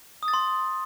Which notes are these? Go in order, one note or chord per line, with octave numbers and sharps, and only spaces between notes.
D#6
A6
C6